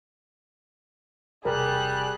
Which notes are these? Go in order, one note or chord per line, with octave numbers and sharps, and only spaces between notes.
E1 C3 G3 G#4 A#4 F#6